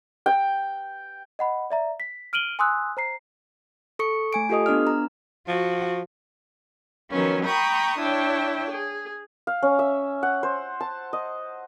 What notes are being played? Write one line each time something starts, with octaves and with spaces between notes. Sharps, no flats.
G5
D#5 F#5 B5
D5 E5 A#5
B6
F6 D7 D#7 F#7 G7
G#5 C6 D#6 E6 F#6
C5 A#5 C7
A4 C#6 C#7
A3 G#5 D7
F4 G4 A4 D#5 D#6
B3 D4 D5 F6
A#5
F3 F#4
D#3 F3 F#3 B3 C#4
G5 A#5 B5 C#6 D#6
D4 E4 C#5 G5
G#4
F5
C#4
E5
F#5
C5
A5
D#5